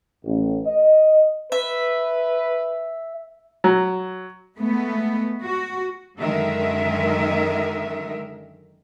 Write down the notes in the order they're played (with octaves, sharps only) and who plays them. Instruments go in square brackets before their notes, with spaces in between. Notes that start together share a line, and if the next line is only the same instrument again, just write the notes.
[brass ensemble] A1
D#5
[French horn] B4 [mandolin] E5
[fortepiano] F#3
[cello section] G#3 A3 B3
F#4
F#2 D3 D#3 G#3 A#4 E5